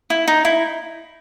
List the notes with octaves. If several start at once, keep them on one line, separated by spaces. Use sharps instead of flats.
E4
D#4
E4